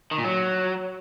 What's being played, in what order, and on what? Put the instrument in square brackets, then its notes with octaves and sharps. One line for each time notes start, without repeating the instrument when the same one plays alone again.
[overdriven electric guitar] D#3
A#2
F#3